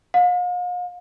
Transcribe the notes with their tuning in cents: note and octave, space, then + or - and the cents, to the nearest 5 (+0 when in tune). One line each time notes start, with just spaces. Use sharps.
F5 +45